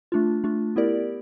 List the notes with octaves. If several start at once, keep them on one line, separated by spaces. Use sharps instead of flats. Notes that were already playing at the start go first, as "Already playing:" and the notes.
A3 D4 F4
A3 D4 F4
B3 E4 G4 A#4 D5